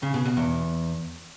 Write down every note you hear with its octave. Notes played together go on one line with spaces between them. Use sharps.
C#3
B2
B2
E2